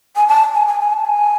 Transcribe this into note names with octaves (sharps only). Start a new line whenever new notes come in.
G#5
A5
G#5
G#5
G#5
A5
G#5